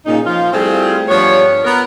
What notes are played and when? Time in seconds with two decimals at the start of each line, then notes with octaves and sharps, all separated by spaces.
0.06 A#2 C#3 D#4
0.26 F3 F4
0.52 G3 A3 C4 E4 F4 G#4
1.09 G2 F3 B3 C#5
1.65 B3 A#4